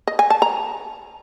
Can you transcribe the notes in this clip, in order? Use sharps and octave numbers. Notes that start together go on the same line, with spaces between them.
D#5
G#5
A5
A#5